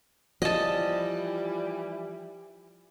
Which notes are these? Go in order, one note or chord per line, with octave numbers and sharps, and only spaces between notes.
E3 F3 G3 D#5 A5